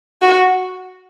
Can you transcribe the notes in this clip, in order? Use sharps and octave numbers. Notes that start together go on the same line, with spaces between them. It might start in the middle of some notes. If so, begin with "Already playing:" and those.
F#4